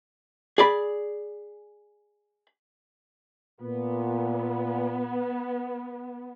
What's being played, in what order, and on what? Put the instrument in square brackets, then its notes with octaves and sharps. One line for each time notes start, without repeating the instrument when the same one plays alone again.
[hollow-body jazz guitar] G#4 D5 B5
[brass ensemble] A#2 [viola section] B3